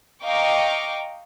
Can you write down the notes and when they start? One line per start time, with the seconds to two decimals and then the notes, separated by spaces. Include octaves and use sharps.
0.24 D#5 F5 G5 A#5 C#6 D6